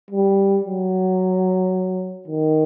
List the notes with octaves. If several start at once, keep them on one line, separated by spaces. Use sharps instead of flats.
G3
F#3
D#3